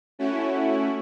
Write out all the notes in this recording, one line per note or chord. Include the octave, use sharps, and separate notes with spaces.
A3 C#4 E4 F#4